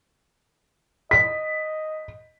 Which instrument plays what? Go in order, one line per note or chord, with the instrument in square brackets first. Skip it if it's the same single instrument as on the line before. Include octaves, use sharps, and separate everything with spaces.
[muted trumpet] D#5 [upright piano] B6